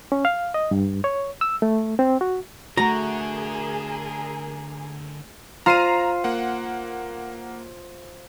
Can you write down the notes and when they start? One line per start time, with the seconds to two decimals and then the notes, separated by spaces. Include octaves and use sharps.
0.12 C#4
0.25 F5
0.54 D#5
0.71 G2
1.04 C#5
1.41 E6
1.62 A3
1.99 C4
2.21 F#4
2.77 D3 A3 F#4 G#4 A#4 A#5
5.66 F4 C5 A#5 C7 D#7
6.24 A#3 F#5